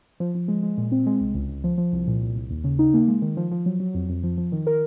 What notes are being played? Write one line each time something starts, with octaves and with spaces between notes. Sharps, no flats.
F3
F3
G#3
G#3
A#2
C4
G#3
C2
C#2
C#2
F3
F3
C2
A#2
C2
C2
D#2
C#3
D#4
A#3
G#3
D#3
F3
F3
F#3
F#3
F2
F2
F3
F3
D#3
A#4